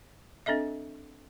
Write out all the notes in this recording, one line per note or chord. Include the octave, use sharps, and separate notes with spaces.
C4 D4 A4 D#5 E5